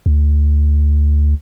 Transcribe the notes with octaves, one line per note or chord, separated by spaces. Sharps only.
D2